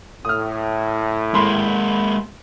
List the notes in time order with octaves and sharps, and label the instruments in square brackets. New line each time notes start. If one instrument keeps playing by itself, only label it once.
[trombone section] A2 [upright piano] D#6 F6
[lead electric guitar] G#3 A#3 [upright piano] B5 C6